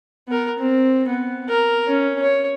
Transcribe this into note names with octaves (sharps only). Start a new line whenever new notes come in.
B3 A#4
C4
B3
A#4
C#4
C#5